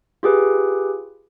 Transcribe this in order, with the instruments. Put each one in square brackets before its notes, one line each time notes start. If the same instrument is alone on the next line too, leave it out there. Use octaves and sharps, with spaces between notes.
[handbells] F4 G4 G#4 B4